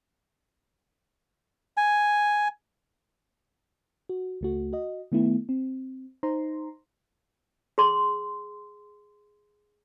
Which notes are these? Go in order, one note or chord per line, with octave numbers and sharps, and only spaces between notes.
G#5
F#4
C#2 A3 F#4
F#4 D#5
D#3 A3 B3 E4
C4
D#4 C5 A#5 C6
G#4 C6